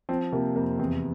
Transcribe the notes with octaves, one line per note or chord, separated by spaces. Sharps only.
F3 C4
C3 A#3
F2 A#3
E2 C4